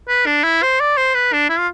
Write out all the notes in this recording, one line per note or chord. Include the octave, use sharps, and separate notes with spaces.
B4
D4
E4
C5
D5
C5
B4
D4
E4
F4